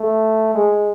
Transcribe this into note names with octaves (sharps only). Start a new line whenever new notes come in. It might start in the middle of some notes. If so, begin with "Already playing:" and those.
Already playing: A3
G#3